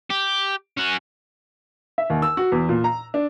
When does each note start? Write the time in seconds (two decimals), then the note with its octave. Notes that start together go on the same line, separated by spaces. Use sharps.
0.10 G4
0.77 C#4 F#4
1.98 E5
2.10 D#2
2.22 E6
2.37 F#4
2.52 E2
2.69 A#2
2.84 A#5
3.14 D4